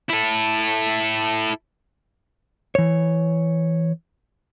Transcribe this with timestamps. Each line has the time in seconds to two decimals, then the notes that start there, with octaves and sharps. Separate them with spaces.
0.10 E4 A4
2.75 E3 C#5